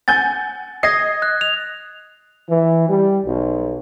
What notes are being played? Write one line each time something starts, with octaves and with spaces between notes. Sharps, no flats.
F#5 G#5 G6 A6
D#5 D#6 G#6 A#6 C7
F#6
F7
E3
G3
B1